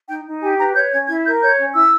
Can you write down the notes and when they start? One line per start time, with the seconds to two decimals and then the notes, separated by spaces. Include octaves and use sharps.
0.08 D#4 G5
0.25 D#4
0.41 G4 G#5
0.58 B4 A#5
0.74 C#5 G6
0.91 C#4 G#6
1.08 E4 G#6
1.24 A#4 G6
1.41 C#5 G6
1.58 C#4
1.74 E4 E6